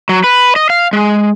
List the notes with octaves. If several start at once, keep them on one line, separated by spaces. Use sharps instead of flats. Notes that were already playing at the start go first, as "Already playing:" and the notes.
F#3
B4
D#5
F5
G#3